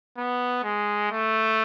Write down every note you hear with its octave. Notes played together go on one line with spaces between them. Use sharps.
B3
G#3
A3